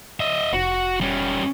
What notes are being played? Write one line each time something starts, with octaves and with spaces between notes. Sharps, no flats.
D#5 E5
F1 F#4
G3 C#4